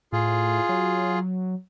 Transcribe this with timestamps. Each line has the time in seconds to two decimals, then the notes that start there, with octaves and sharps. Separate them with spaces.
0.13 A2 F4 G#4
0.69 F#3